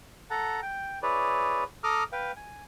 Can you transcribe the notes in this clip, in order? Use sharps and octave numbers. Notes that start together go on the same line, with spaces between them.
A4 F#5 A5 A#5
G5
E4 G#4 B4 C#5 D5
A4 A#5 D6 D#6 F6
B4 F5 G5
G#5